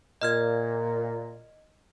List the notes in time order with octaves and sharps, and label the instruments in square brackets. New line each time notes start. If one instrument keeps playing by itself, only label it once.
[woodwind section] A#2 [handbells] D#5 F6 G#6